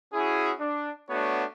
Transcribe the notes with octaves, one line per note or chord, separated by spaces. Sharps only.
C#4 E4 F#4 G#4
D4
A3 B3 D4 F#4 C#5